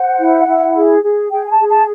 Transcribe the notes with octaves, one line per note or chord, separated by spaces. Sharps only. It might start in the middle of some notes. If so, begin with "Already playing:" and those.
Already playing: C5 F#5
E4
E4
G#4
G#4
G#4 G5
G#5
A5
G#4
A5